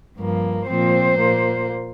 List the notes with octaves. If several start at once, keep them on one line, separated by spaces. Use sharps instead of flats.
G2 F3 A#3
A#2 F3 C4 C5
A#2 A#3